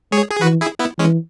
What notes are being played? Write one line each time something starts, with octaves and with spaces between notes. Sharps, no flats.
G#3 G#4 C#5
G#4
E3 F#4 B4
E4 G#4
B3 E4
E3 G#3 C#4